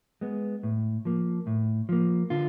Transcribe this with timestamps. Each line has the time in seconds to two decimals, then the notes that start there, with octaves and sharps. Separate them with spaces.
0.21 G#3 B3
0.63 A2
1.05 F3 A#3
1.47 A2
1.89 F3 A#3
2.30 D3 F4